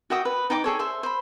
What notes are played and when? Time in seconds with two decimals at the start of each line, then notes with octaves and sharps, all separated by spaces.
0.10 F#4 E5 G5 D#6
0.25 B4
0.50 D#4 D#5 G5 D6
0.64 G#4 A4 C#5
0.79 C5 E5
1.03 C5 B5